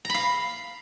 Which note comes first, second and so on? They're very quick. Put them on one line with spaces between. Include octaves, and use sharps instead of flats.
A#5 B5 F5